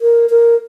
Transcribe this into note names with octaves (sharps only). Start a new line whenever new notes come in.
A#4
A#4